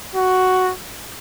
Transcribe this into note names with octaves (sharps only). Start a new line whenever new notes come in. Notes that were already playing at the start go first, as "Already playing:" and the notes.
F#4